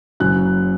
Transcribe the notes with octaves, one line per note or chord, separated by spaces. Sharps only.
F#1 F#2 C#3 F#3 F#6